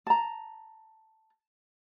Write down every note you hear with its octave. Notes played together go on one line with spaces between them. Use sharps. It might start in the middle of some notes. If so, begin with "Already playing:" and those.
A5 A#5